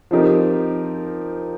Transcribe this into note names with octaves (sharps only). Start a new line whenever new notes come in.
F3 C4 D#4 G4 A#4